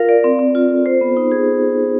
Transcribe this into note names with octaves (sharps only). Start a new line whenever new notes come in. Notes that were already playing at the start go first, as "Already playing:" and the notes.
Already playing: F4 A#4 F5
D5
C4
C4
F4
A4
C5
B3
D#4
G#4